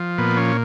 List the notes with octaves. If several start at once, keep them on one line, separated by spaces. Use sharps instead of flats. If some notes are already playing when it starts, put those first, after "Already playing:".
Already playing: F3
A#2 B3
C#4